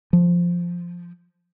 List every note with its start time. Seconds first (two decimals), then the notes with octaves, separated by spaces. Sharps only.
0.13 F3